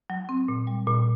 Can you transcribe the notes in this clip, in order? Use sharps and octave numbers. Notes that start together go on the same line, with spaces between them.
F#3
C4
A#2
G3
A#2